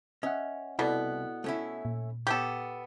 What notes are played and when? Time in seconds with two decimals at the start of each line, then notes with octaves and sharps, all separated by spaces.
0.23 C#4 D#5 E5 F#5
0.79 C2 B2 B3 E4 A4 D5
1.44 A3 C#4 E4
1.85 A#2
2.27 B3 G4 A4 C#5